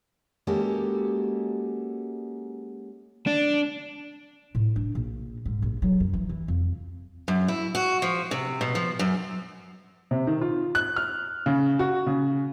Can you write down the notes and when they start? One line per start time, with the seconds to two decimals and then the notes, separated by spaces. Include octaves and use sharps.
0.47 G#3 A#3 C#4 F#4 G4 A4
3.27 D4
4.55 A2
4.76 D4
4.95 A#1
5.46 G#2
5.62 A#1
5.82 F#3
6.00 F#2
6.14 E3
6.29 E3
6.48 F2
7.28 F#2
7.48 E4
7.75 F#4
8.02 F3
8.31 C3
8.61 B2
8.75 F3
8.99 F#2
10.11 C3
10.27 D#3
10.41 F4
10.75 F#6
10.96 F6
11.46 C#3
11.79 F#4
12.07 C#3